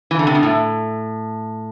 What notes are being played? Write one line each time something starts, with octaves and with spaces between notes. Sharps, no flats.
E3
D3
C3
B2
A2